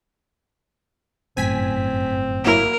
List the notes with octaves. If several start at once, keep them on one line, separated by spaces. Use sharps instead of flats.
G1 F#2 A2 C4 G#5 B6
F#3 A#3 E4 A#4